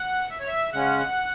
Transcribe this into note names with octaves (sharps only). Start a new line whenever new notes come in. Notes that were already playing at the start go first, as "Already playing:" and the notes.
Already playing: F#5
E5
C#5
E5
C#3 G#3 C#4 F#5